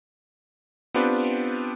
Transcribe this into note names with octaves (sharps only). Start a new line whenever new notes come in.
B3 C4 D4 F4 G4 B4